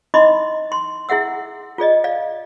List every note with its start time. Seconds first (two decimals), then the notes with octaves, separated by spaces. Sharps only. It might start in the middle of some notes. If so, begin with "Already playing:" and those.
0.14 D#4 E4 D#5 B5 C6 D6
0.72 C6
1.09 E4 G#4 E5 F#5 E6
1.78 F4 G#4 D5 D#5
2.04 D5 F5